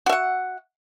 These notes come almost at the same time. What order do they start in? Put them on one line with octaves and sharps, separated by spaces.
F#4 E5 F#5